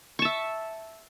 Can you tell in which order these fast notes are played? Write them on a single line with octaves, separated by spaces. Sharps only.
C#6 A5 E5